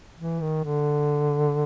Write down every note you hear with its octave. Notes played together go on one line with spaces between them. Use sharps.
E3
D#3
D3